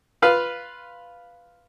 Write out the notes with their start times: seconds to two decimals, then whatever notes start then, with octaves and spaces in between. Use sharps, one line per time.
0.22 F4 B4 F5